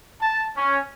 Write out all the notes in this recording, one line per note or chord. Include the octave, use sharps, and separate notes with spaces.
A5
C#4